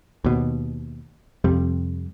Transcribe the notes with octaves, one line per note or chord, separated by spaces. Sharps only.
D#2 B2
F2 C3 G3